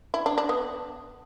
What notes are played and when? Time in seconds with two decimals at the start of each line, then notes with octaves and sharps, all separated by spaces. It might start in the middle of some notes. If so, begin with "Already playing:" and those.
0.14 E4
0.26 D4
0.38 D4
0.49 B3